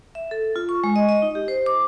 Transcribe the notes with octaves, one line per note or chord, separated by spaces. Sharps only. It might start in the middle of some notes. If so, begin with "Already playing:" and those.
E5
A4
F4
C#6
G#3
D#5
D#5
D#4
G4
C5
D6